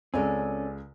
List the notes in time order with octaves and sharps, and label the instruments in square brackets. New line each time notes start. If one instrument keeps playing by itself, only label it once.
[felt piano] C#2 G#3 [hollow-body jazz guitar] C4 C#4 [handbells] A4 D5 G#5